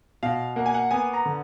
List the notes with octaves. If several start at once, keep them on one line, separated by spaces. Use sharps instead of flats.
B2 F5
A#3 F#5
G#5
F#5
B3 G#5
A#5
D3